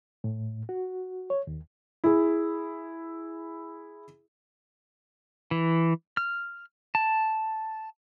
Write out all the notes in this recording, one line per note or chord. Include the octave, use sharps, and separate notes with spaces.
A2
F#4
C#5
D#2
E4 G#4
E3
F6
A5